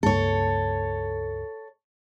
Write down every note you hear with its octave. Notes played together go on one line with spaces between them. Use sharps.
C#2 G2 A#3 A4 C#5